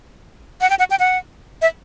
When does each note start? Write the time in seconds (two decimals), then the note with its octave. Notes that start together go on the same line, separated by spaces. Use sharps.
0.61 F#5
0.70 G5
0.79 F#5
0.90 G5
0.99 F#5
1.62 E5